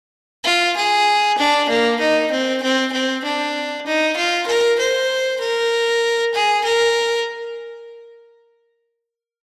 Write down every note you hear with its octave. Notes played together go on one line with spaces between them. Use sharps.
F4
G#4
D4
A#3
D#4
C4
C4
C4
D4
D#4
F4
A#4
C5
A#4
G#4
A#4